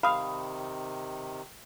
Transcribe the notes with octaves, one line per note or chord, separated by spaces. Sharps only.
C3 D#3 F5 B5 D#6